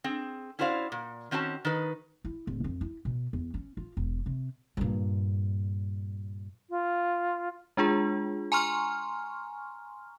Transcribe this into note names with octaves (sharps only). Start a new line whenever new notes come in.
C4 G#4
C#4 E4 F#4 C5 D5 F5
A#2
D#3 C4 C#4 F#4 A5
D#3 D#4 B4
E4
D1
F2
E4
B2
E2
C#4
F4
E1
C3
G2 A#2
F4
G#3 D4 F4 G#4
G#5 A#5 C6 C#6 F6